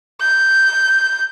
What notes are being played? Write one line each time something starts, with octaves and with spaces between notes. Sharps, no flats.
G6